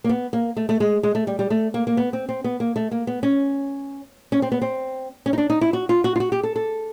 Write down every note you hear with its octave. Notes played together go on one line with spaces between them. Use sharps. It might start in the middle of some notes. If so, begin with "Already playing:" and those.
A#3
B3
A#3
A3
A3
G#3
G#3
A3
G3
G3
A3
A#3
A#3
B3
C4
C4
B3
A#3
A3
A#3
B3
C#4
C#4
C4
B3
C4
C#4
D#4
D4
D#4
E4
F#4
F4
F#4
F4
F#4
G4
A4
A4